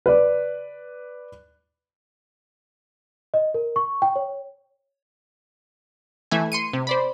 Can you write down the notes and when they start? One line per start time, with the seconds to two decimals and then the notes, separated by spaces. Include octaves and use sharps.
0.06 B4 D5
3.34 D#5
3.54 A#4
3.76 C#6
4.02 G5
4.16 C#5
6.31 E3 A3 E5 G#5
6.52 C6 C#7 D#7
6.73 C3
6.87 C5 D5 B5